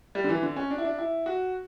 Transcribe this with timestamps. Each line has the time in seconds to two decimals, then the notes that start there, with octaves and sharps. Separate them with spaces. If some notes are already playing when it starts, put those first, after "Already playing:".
0.15 G3
0.24 D3
0.29 E3
0.43 D3
0.56 C#4
0.71 D4
0.78 E4
0.85 D4
0.98 E4
1.26 F#4